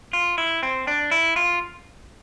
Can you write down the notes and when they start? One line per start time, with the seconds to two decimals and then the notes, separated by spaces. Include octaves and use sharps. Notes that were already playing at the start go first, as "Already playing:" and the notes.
0.13 F4
0.38 E4
0.63 C4
0.87 D4
1.11 E4
1.36 F4